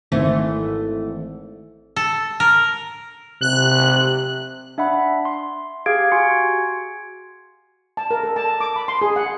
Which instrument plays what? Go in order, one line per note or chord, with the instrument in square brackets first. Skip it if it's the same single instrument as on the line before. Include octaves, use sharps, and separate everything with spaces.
[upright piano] G#1 [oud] E3 A3 C5
[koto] A4
A#4
[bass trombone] C3 [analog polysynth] F#6
[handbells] D4 E5 F#5 B5
C6
G4 G#4 F5 G#6 D7
F#4 G#5 C6 G#6 C#7
[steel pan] A5
A#4
A4
A5
D6
B5
C6
G#4
F#5